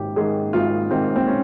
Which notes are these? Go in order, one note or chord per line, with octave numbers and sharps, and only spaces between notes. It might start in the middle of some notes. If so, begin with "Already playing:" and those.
Already playing: G#1 G#2 G4
G#2 D#3 G#4
G#1 F4
G#2 D#3 C4
C4
C#4